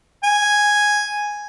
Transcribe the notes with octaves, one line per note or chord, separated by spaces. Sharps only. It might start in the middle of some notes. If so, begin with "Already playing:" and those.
G#5